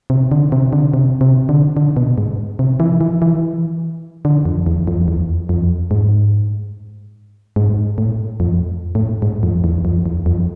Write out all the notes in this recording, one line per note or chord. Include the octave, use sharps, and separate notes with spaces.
C3
D3
C3
D3
C3
C3
D3
D3
B2
G#2
C3
E3
E3
E3
D3
F2
E2
F2
E2
F2
G#2
G#2
A2
F2
A2
G#2
F2
E2
F2
E2
F2